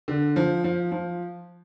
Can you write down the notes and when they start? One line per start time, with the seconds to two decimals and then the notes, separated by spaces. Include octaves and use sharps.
0.08 D3
0.36 F3
0.64 F3
0.92 F3